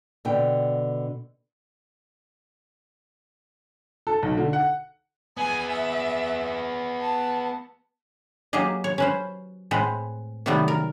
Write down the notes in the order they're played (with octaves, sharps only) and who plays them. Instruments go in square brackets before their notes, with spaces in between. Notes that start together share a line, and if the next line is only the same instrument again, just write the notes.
[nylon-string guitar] B2 D3 G5
[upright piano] A4
B1
D3
F#5
[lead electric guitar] B3 G#4 [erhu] G#5
[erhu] E5
A5
[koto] F#3 A#3 G4 G#4 D#5
C#5
C#4 B4 C5
A2 G#3 C4 B4
C3 D#3 F#3 G3 A3 B3
A#4